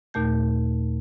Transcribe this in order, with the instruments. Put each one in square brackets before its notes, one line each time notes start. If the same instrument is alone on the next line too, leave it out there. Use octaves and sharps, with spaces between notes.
[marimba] D#2 A#2 A3 G6